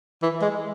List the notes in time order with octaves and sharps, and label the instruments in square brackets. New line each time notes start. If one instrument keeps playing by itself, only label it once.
[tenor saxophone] E3
G#3